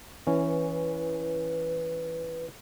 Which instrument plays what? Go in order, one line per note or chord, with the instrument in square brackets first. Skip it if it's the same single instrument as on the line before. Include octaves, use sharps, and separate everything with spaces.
[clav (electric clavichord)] E3 C#4 [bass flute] B4